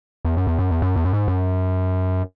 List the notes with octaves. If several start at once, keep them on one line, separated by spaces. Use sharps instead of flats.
E2
F#2
E2
F#2
E2
F#2
E2
F#2
G#2
F#2